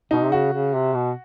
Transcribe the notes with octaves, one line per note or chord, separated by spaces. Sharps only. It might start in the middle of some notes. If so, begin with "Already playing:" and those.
B2 D#4
C3
C#3 F#4
C#3
C3
B2